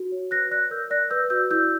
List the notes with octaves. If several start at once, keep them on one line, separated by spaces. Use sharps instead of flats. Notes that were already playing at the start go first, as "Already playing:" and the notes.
Already playing: F#4
C#5
B4 F#6 A#6
D5 F#6 A#6
A#4 E6 G6
D5 F#6 A#6
B4 E6 G6
F#4 E6 G6
E4 E6 G6